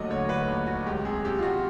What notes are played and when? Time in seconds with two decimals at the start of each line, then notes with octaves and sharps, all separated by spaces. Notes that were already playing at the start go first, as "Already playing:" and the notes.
Already playing: D#2 D3 F#3 A3 D#5
0.10 D3 C#5
0.29 D3 B4
0.48 D#2
0.67 F#3 F#4
0.86 C#2 G4
1.05 C3 G#4
1.25 C3 G4
1.39 F4
1.43 C#2 F#4